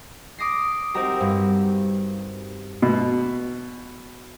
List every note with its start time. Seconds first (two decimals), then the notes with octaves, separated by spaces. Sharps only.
0.38 D6 D#6 A#6 C7
0.94 C4 D#4 F#4 G4 A#4
1.21 G2
2.82 B2